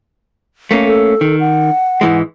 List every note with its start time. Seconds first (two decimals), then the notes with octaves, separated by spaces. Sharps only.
0.71 A3 A#3 C#4
0.87 A4
1.21 D#3
1.40 F#5
2.01 G#2 E3 G#3